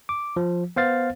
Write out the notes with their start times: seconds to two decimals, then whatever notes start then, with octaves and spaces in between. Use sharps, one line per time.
0.09 D6
0.36 F3
0.76 B3 C5 F5 A6